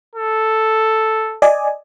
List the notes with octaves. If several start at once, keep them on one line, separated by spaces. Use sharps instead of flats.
A4
D5 D#5 G#5